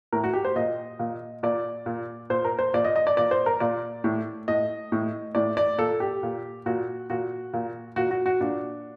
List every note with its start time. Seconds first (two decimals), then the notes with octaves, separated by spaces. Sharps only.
0.12 A2 A#4
0.24 F#4
0.33 G4
0.45 C5
0.56 A#2 D#5
0.99 A#2
1.43 A#2 D5
1.86 A#2
2.30 A#2 C5
2.44 A#4
2.59 C5
2.74 A#2 D5
2.84 D#5
2.96 D#5
3.07 D5
3.17 A#2 D5
3.31 C5
3.46 A#4
3.60 A#2 D5
4.04 A2
4.48 A2 D#5
4.92 A2
5.35 A2 D5
5.57 D5
5.78 A#2 A4
6.00 G4
6.23 A#2
6.66 A#2 F#4
7.10 A#2 F#4
7.53 A#2
7.96 A#2 F#4
8.11 F#4
8.26 F#4
8.41 A#2 D4